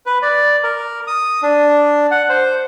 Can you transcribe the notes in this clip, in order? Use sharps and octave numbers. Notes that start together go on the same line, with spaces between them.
B4
D5
A#4
D#6
D4
F#5
C5